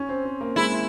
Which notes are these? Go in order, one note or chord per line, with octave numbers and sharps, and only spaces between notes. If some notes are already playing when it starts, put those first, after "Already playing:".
Already playing: C#4
C4
C4
A#3
G#3 E4